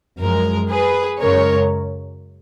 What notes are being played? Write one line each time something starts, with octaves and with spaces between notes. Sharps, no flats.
F#2 F3 G#3 A#4
G#4 B4
F#2 C#3 G#3 A#4 C#5